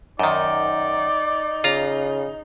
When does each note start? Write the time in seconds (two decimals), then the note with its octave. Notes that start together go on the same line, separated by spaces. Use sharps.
0.19 F#2 D#3 D#4 D5
1.64 C#3 F4 A#5